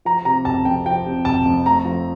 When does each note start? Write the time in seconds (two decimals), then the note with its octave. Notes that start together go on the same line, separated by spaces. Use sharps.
0.05 F3 A#5
0.25 C3 A#5
0.45 F1 A5
0.65 F2 G5
0.86 F3 G5
1.06 C3
1.25 F1 A5
1.45 F2
1.66 A3 A#5
1.85 F3